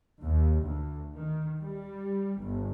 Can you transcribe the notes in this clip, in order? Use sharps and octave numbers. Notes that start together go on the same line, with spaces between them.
D#2
D2
D#3
G3
G1